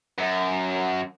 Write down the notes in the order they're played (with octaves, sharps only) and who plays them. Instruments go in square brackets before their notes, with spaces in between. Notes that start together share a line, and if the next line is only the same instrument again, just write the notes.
[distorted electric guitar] F#2